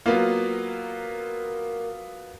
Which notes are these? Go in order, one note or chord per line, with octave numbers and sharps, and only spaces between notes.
F#3 A#3 B3 F4